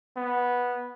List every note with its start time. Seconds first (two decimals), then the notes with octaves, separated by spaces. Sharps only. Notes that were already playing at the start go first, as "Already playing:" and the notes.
0.17 B3